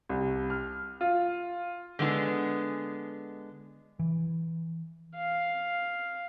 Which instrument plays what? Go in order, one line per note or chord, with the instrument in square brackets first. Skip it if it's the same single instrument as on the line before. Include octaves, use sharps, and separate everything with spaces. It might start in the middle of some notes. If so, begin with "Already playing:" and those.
[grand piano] C2
F6
F4
[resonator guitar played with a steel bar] D3 G#3 B3 E4 G#4
[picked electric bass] E3
[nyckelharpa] F5